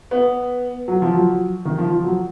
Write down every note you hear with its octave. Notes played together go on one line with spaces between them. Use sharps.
B3
F#3
F3
F#3
D#3
F3
F3
F#3